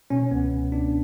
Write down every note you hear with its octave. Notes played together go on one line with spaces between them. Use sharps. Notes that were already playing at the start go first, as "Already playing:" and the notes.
B2 C#4
C#2 B3
C#2
C#2 D4